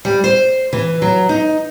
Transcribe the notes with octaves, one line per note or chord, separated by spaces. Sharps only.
G3
C5
E3
F#3
D#4